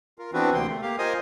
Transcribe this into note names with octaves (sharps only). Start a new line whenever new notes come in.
F4 A#4
E3 B3 C4 D4 F#4 B4
D2 C3 A#3 G5 C6
A3
A#3 G4 F5
F4 A#4 C5 D#5 G#5 D#6